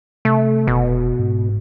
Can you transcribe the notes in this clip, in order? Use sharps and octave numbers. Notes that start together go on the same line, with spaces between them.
C3 A3
F1 B2
G#2